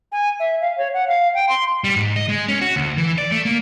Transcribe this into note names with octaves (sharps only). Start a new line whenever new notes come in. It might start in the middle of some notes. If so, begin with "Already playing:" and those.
G#5
E5
F5
C#5
F#5
F5
G5
C6
G3
G#2
D#5
G#3
C#4
F#4
D2
E3
D5
A3
A#3